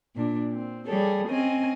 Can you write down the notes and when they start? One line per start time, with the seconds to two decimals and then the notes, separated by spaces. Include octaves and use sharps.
0.16 A#2 D4
0.52 C4
0.86 G3 G#4 A4 C#5
1.27 C4 C#4 D#5 G#5